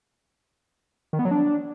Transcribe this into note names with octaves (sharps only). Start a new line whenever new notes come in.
D#3
B3
F#3
D4